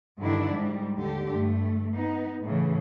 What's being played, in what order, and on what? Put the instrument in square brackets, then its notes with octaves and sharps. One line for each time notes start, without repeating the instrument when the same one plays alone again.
[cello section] G2 D3 D#3 D4 E4
G#2 G3
D#2 D3 G4
G2 A3
B3 D#4
A2 C#3 E3